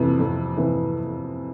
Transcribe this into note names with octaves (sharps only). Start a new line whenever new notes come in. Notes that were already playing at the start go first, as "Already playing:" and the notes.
Already playing: F2 C3 E3
F2
C3 E3